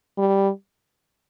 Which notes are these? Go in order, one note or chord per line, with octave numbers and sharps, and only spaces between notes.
G3